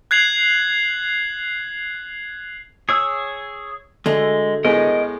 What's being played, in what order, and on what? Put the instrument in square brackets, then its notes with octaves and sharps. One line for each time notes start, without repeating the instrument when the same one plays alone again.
[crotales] F#6 G#6 C7 F7 F#7
[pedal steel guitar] G#4 C#5 E6
[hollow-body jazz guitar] D2 D3 A3 [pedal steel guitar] G#3
[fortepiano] A2 G#3 B3 [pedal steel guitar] A#4 D#5